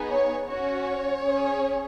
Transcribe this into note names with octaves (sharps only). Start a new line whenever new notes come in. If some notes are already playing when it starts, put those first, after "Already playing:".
Already playing: B3 D#4 G#4
C#5
C#4 F#4 C#5
C#4 G#4